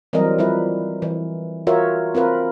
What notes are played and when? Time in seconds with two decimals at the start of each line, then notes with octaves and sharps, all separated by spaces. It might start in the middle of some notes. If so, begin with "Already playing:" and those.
0.13 E3 F#3 G3 C4 A#4 D#5
0.39 F3 G3 E4 B4
1.02 E3
1.67 F4 F#4 A#4 C#5 E5
2.15 C4 F4 A#4 B4